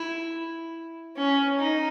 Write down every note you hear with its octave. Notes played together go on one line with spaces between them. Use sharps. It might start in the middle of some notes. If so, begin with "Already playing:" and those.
Already playing: E4
C#4
D#4